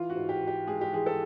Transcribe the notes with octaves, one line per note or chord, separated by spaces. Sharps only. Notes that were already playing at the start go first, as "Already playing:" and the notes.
Already playing: E3 F4
F#4
G#2
G4
G#2
G4
G#3 G#4
G4
E3 G#4
A4